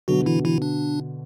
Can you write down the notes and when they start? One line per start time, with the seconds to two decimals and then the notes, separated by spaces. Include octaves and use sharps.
0.08 B2 D3 F#3 F#4
0.26 E3 E4
0.45 E3 E4
0.62 D4